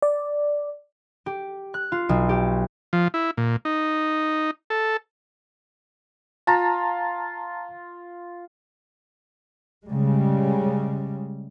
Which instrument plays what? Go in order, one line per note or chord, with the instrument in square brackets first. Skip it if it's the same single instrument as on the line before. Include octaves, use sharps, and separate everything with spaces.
[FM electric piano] D5
[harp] G4
F#6
F4
B1
G4
[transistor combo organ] F3
E4
A#2
D#4
A4
[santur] F4 [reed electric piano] A5 A#5
[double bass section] C#3 G3 G#3